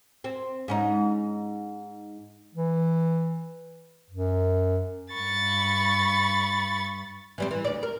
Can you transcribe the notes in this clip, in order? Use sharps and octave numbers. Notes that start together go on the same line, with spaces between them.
C4
G#2 C#4 D#4
E3
F#2
G2 B5 C#6 A6
E3 G3 C4
E3
D2 D5
A#4